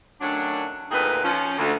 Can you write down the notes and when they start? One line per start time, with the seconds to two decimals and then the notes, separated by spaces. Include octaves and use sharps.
0.21 D#3 F#3 A3 C#4 D4
0.91 D2 A#2 C4 D#4 G#4 B4
1.23 F3 C#4
1.58 D2